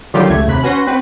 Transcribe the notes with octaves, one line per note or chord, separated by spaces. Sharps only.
D3 D#3 F#3 G3 F4 G4
C#2 A3 G#6
D#2 C3 B5 F#6
C#4 F#4 B4 C6 A#6
C4 F#4 B4